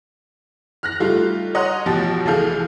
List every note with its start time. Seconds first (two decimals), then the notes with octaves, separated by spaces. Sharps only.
0.83 F6 F#6 A#6
1.00 G3 A3 D#4 F4
1.55 C#5 D#5 F#5 A#5 C6 F#6
1.86 A1 B2 F3 G4 A6
2.25 F1 E3 G#4 A4 F5 G6